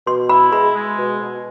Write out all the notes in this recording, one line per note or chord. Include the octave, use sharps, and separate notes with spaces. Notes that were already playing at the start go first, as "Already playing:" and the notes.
B2 C6
E4 B5
G#3 B5
G#3
B2
B2